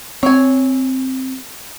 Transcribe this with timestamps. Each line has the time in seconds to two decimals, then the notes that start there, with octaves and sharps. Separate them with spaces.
0.23 C4 C#5 G#5